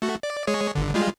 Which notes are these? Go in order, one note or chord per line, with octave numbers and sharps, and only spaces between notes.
A3 F#4
D5
G#3 G#4 C#5
G1 D3
G3 G#3 F4